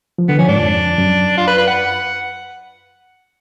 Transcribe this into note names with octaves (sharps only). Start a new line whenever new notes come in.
F3
D3 B3
F3 C#4
G#2 D4
F2
F#2
F4
B4
B4
F#5